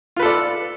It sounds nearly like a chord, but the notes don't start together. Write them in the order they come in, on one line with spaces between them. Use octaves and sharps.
F4 B4 A4 D5